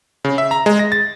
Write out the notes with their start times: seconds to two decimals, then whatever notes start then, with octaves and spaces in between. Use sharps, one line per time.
0.25 C#3
0.38 E5
0.51 A#5
0.66 G#3
0.79 A#6
0.92 A6